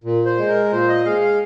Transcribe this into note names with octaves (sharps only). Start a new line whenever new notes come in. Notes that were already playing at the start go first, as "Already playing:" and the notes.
A#2
C5
G#3
A#4
A#2 C5
D#5
G#3 F5
F5